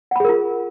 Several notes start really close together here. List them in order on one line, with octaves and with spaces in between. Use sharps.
F#5 B5 G#4 A#4 F4